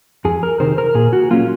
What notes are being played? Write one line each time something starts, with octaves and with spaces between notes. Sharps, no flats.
F2 G#4
A#4
C3 D#3 C5
A#4
A#2 G#4
F#4
F#3 A#3 C#4 F4